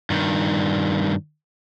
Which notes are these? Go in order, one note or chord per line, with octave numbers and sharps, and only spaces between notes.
G2 D#3